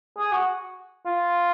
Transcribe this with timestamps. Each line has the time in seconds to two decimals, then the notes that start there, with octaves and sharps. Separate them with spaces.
0.17 G#4
0.32 F#4
1.06 F4